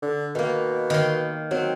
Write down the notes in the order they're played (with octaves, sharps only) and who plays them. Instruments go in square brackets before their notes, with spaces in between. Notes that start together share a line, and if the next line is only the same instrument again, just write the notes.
[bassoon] D3
[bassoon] B2 [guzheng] D#3 A#3
[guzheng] D#3 C#5 C6
[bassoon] F#3 [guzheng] C4